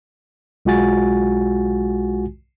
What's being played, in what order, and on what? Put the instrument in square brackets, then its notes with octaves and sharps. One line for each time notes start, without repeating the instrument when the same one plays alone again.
[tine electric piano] B1 G#3 F4 F#4 G#5 A6